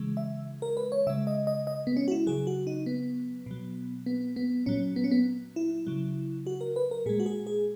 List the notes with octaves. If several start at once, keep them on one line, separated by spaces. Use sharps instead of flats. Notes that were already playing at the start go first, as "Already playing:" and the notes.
Already playing: C#3 E3 G#3
E5
A#4
B4
C#5
C#3 G#3 E5
D#5
D#5
D#5
B3
C#4
F#4
E4
C#3 F#3 G#4
F#4
D#4
B3
B2 F#3
B3
B3
A#2 F#3 C#4
B3
C#4
B3
E4
C#3 F#3
F#4
A#4
B4
A#4
A#2 G#3 G#4
F#4
G#4
G#4